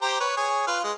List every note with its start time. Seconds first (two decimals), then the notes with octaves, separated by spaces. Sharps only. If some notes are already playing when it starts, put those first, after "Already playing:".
0.02 G4 C5 A#5
0.20 B4 C#5
0.37 G#4 C#5
0.67 F4 B4 F5
0.84 G#3